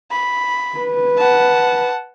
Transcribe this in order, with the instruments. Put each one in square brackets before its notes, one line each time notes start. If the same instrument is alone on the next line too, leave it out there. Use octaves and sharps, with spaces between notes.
[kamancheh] B5
[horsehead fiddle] B4
[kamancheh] F#5 A5